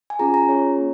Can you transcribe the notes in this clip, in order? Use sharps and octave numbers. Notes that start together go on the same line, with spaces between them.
G#5
C#4 F4 G#4 A#5
A#5
C#4 F4 G#4 C#5
A#3